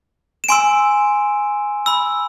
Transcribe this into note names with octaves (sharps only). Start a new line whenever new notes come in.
E7
G#5 C6 E6 D7
B5 E6